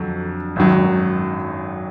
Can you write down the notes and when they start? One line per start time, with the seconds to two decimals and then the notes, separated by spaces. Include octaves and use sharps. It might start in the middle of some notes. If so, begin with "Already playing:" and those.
Already playing: F2 D3 F#3 D4
0.56 G#1 F#2 D#3 F#3